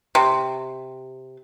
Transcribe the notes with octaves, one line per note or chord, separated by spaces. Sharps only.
C3